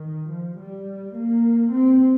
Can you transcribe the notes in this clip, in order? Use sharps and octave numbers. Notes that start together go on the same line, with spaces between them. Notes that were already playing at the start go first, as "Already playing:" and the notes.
Already playing: D#3
F3
G3
A#3
C4